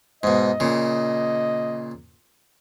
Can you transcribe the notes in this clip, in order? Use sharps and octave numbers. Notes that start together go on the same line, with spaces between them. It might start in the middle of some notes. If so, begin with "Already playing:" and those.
G#2 B2 D#5
A#2 C#3